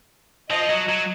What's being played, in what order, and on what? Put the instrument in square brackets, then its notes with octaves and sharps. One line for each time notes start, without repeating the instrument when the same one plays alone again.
[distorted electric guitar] F3 [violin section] D#5
[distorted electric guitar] F#3
F#3